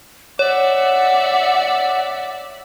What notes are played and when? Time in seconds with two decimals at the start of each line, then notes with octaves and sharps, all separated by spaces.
0.39 C#5 D5 E5 F#5